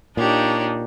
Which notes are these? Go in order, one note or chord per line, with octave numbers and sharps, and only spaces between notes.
A#2 D4 D#4 G4 C#5